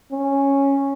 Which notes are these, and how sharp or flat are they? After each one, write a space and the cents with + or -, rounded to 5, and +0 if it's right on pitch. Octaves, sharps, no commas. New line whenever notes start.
C#4 -5